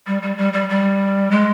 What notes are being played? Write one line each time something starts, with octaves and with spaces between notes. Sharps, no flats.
G3
G3
G3
G3
G3
G#3